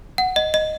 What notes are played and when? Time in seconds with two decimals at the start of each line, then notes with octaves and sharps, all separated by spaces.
0.18 F#5
0.36 D#5
0.54 D#5